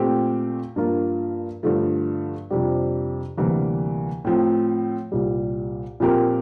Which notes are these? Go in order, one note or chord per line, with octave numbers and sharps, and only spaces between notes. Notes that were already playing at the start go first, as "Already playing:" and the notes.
Already playing: A#2 A3 C4 G4
G2 F3 A#3 F4 A#4
G2 D3 F3 A3
F2 C3 G3 D4 G4
D2 C3 E3 G3 A#3
A2 F3 C4
C2 A#2 G3
A#2 F3 C4 G4 A#4